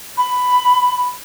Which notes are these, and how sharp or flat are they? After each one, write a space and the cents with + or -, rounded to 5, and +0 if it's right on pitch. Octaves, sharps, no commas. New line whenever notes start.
B5 +10